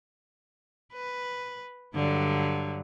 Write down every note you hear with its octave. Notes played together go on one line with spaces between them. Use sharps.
B4
G2 D3 F#3